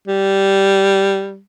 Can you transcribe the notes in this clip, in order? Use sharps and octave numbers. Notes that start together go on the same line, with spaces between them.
G3